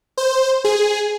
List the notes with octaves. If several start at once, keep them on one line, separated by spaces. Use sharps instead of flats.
C5
G#4